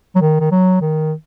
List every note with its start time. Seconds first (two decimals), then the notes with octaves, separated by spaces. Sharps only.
0.15 F#3
0.21 D#3
0.40 D#3
0.51 F#3
0.81 D#3